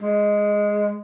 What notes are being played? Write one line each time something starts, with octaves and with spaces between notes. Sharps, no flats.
G#3